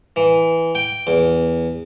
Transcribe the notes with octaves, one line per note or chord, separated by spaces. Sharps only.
E3
G5
E2